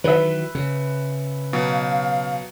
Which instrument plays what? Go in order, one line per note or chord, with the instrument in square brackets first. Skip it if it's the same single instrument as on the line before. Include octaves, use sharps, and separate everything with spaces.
[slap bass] D#3 E3 F#3 [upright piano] B4 E5
[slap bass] C#3
[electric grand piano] B2 F#3 [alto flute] F5